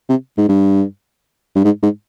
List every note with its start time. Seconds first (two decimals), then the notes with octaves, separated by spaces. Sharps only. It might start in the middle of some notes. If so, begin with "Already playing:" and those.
0.09 C3
0.37 G#2
0.48 G2
1.56 G2
1.64 G#2
1.82 G#2